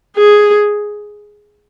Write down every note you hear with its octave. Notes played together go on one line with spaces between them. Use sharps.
G#4